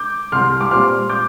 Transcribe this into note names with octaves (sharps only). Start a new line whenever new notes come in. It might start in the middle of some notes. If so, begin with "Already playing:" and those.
Already playing: D6 G6
C2 C6 F6
D6
A#2 G3 C4 C6 F6
D6 G6